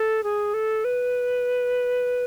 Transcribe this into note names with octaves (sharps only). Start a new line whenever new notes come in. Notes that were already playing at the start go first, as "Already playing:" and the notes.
Already playing: A4
G#4
A4
B4